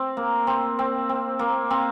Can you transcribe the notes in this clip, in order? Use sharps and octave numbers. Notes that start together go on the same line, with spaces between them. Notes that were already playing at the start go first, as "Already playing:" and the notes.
Already playing: C4
A#3
C4
C4
C4
A#3
C4